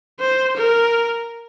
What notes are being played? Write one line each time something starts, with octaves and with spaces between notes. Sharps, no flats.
C5
A#4